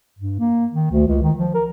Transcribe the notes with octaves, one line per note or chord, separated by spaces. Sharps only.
G2
A#3
D#3
D2
C#2
D#3
F3
A#4